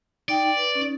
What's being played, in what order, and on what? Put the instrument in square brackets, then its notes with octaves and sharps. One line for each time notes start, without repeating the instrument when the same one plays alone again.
[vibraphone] D#4 G5 [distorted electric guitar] D5
[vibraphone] B4
C#4 D#4